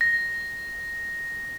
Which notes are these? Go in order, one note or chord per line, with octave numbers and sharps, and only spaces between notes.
A#6